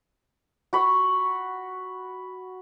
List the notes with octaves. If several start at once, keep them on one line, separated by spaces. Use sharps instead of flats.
F#4 B5 C#6